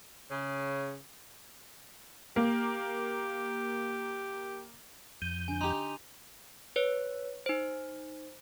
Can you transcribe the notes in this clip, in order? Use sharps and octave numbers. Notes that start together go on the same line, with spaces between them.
C#3
A#3 G4
F2 G6 D#7
D3 G#5
D#4 G4 C6 F7
B4 C#5
D#4 C5